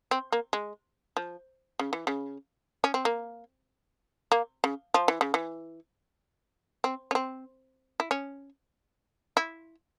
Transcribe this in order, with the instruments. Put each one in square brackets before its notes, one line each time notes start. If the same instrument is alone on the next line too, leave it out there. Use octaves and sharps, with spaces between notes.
[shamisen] C4
A#3
G#3
F3
C#3
E3
C#3
C#4
C4
A#3
A#3
C#3
F3
E3
C#3
E3
C4
C#4
C4
E4
C#4
E4